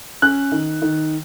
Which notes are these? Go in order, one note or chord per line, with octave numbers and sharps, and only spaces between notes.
C#4 F#6
D#3
D#3